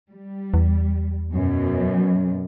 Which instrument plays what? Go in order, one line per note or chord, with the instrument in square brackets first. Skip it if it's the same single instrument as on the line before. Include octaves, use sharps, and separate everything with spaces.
[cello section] G3
[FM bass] E2
[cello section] F#2 B2 F#3